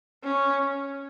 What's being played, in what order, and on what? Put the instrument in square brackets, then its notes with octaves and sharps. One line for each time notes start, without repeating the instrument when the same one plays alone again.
[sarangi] C#4